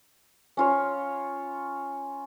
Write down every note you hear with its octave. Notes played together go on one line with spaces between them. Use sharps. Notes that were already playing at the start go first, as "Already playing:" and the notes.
C#4 F4 C#5